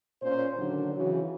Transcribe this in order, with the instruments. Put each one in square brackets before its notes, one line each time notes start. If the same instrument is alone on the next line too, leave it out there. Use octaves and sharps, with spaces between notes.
[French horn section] A#2 C#4 C5
D3 D#3 F#3 D4
C#3 E3 F#3 F#4